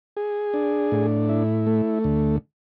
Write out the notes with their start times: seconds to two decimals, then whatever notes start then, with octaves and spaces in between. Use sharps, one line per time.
0.17 G#4
0.54 D4
0.92 A2
1.29 E4
1.67 A3
2.04 D2